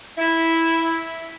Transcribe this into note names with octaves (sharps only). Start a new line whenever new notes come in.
E4